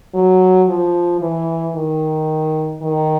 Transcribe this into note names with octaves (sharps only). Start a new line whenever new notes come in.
F#3
F3
E3
D#3
D#3